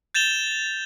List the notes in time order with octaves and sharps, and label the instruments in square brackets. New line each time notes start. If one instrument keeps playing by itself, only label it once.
[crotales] G6 A6 E7 F7 G7